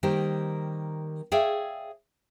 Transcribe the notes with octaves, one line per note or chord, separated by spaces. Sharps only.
D#3 G3 A#3 G4 C5
G#4 C#5 D5 E5 F5 G5